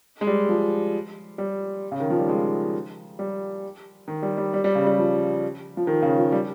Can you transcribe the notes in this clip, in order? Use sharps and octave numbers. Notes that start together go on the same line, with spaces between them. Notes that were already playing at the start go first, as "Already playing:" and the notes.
G#3
G3
F3
G3
C#3
D#3
F3
G3
G#3
G3
D#3
G3
G3
G3
G3
C#3
G3
F3
F3
D#3
C#3
F3
G3